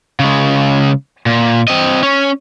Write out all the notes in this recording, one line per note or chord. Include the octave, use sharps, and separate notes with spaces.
C#3 G#3
A#2
C4 D#5
C#4